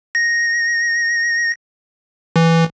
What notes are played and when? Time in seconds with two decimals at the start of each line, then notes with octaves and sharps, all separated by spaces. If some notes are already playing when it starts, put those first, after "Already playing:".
0.15 A#6
2.36 E3